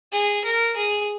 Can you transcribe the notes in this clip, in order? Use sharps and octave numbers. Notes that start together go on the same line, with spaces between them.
G#4
A#4
G#4